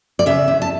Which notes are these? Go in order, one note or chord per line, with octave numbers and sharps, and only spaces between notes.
D5
C#3 E5
E2
A5